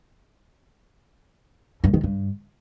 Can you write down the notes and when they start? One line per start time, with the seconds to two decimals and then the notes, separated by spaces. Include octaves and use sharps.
1.84 G2
1.94 D#3
2.03 G2